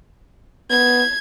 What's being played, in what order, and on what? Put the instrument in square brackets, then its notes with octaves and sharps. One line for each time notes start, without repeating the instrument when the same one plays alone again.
[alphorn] B3 [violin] G#6